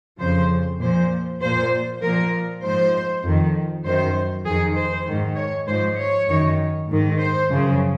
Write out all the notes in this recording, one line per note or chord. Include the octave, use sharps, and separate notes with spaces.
F2 C#3 F3 C5
A#2 F3 C5
A#2 F3 C5
A#2 F3 A#4
G#2 F3 C5
F2 D#3
F#2 D#3 C5
F2 D#3 G#4
C5
G#2 D#3
C#5
G#2 F3 C5
C#5
F#2 D#3
G#2 D#3
C5
F#2 C#3 F3